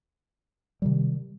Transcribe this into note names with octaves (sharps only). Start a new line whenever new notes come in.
C3 D#3 G3